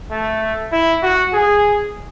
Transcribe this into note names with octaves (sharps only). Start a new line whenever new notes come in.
A3
E4
F#4
G#4